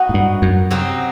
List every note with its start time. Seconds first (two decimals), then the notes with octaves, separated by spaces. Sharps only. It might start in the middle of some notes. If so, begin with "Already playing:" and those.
Already playing: F#3 B3 D#4 F#4
0.09 A2
0.14 G2
0.42 F#2
0.71 C3 F#3 C4 D#4